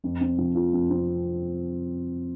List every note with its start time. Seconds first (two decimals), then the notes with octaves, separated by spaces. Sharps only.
0.04 F2
0.21 C4
0.38 F3
0.55 F4
0.73 F2
0.90 C4